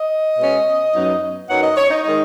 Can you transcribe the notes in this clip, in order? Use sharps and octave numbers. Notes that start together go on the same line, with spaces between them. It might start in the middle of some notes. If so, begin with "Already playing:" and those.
Already playing: D#5
B2 G#3 C#4
F#2 F#3 B3 D#4
F#2 F#3 B3 D#4 F#5
D#5
C#5
D#4
D#3 G#3 D#4